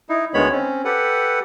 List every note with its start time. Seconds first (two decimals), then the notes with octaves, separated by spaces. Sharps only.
0.09 D#4 E4
0.34 D2 D#3 G#3 B3 C#5 B5
0.52 C4 C#4
0.85 G4 A4 B4 F#5